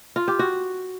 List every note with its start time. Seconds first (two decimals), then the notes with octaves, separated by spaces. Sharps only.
0.16 F4
0.28 G4
0.39 F#4